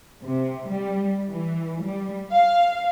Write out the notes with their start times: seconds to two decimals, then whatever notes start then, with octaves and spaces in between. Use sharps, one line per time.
0.23 C3
0.69 G3
1.29 E3
1.83 G3
2.31 F5